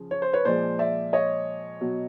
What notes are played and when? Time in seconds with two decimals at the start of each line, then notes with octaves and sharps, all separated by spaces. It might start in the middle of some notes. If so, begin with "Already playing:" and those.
Already playing: C#3 F3
0.11 C#5
0.22 C5
0.33 B4 C#5
0.45 A#2 F3 G#3 C5 D5
0.79 D5 E5
1.13 C#5 D#5
1.81 B2 F#3